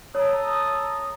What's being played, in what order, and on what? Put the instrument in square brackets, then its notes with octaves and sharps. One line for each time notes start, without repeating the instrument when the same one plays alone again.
[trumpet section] A4 A#5 D#6 [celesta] C#5